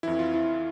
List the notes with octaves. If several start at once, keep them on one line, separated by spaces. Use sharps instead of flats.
F2 E3 E4
F4
E4